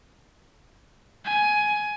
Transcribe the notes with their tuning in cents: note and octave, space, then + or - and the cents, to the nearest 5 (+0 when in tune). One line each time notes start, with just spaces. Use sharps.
G#5 +10